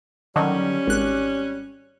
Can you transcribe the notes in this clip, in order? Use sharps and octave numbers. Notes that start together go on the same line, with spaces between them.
D3 D#3 F#3 G3 C#4
G#1 F#6